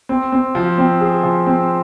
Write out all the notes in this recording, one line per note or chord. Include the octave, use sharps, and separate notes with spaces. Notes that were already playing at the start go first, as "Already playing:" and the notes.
C4
C4
F3
C4
G#4
F3
C4